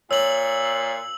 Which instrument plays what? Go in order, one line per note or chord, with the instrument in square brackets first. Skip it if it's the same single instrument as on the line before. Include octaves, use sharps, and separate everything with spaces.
[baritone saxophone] A#2 [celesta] C#5 [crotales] E6 F#7